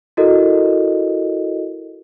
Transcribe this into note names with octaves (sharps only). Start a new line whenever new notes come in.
E4 F#4 A4 A#4 D#5